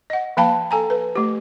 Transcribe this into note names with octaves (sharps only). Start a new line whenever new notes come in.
D#5 F#5
F3 A#3 F5 G5 A5 B5
A4 G#5 A#5
B4
A3 G4